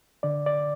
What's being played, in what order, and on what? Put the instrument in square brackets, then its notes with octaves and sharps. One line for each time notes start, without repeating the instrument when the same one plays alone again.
[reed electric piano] D3 D5
D5